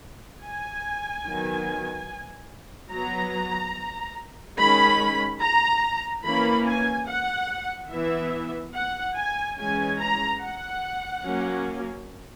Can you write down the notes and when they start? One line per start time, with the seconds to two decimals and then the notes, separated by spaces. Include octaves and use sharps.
0.42 G#5
1.25 D#3 F#3 B3
2.91 F#3 B3 A#5
4.58 D#3 G#3 C#4 B5
5.41 A#5
6.24 E3 A#3 C#4 B5
6.66 G#5
7.07 F#5
7.90 E3 B3 E5
8.74 F#5
9.15 G#5
9.57 E3 G#3 C#4 G#5
9.98 A#5
10.40 F#5
11.23 F#3 A#3 C#4